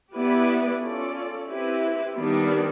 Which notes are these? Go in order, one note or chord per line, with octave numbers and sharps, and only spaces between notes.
B3 E4 G4 B4 D5
C#4 F4 A4 D5
C4 E4 G4 B4
D#3 G3 B3 D4